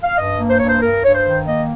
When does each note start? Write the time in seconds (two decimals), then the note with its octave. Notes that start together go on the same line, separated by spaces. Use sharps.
0.04 F5
0.17 G2 D#5
0.39 A#3
0.50 C5
0.60 G2 C#5
0.69 C5
0.82 G2 A#4
1.04 G2 C#5
1.15 C5
1.26 D#3
1.47 A#3 D#5